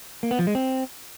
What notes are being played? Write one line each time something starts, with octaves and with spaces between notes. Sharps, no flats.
A#3
B3
F3
G#3
C4